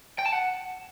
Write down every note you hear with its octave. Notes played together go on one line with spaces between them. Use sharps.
G5
A5
F#5